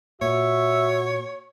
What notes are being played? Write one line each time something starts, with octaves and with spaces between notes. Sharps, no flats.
A#2 F#4 C#5 E5